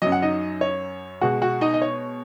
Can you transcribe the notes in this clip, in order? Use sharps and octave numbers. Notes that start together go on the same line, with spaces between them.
F#2 F#3 D#5
F#5
D#4 D#5
C#5
B2 G#3 F#4 F#5
F#4 F#5
D#4 D#5
D#5
C#5